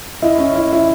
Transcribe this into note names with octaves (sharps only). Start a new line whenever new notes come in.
E4 D#5
C#4
E4
E4